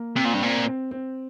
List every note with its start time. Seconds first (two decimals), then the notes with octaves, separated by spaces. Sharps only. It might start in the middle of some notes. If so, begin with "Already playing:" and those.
Already playing: A#3
0.16 C3 C4
0.25 A#2
0.34 G2
0.42 A#2 C4
0.66 C4
0.91 C4